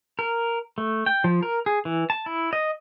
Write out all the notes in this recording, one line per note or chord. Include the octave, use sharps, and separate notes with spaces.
A#4
A3
G5
F3
A#4
G#4
E3
A5
E4
D#5